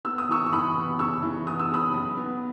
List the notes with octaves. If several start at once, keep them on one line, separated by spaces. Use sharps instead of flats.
B3 E6
D#6
E3 C#6 E6
C#6
E3 B5 D#6
B3
C#3 C#6 E6
E3
B3 D#6
E6
C#3 B5 D#6
B1
B3